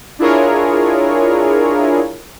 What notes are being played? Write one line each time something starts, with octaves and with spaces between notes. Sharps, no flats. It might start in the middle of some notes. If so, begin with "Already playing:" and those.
D4 E4 F4 G#4 A#4 C#5